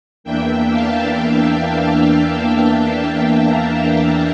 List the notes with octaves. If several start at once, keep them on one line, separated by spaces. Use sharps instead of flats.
E2 E3 A#3 D4 E5 G5
F5 A5
F5 A5
G5 A#5
F5 A5